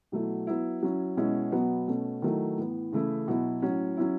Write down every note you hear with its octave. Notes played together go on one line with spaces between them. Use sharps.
B2 F#3 A3 E4
F#3 B3 E4
F#3 C#4 E4
B2 G#3 C#4 E4
B2 F#3 B3
B2 A3 C#4
D#3 F#3 A3 E4
A2 E3 B3
C#3 E3 A3 E4
B2 F#3 B3 E4
A2 F#3 C#4
F#3 C#4 E4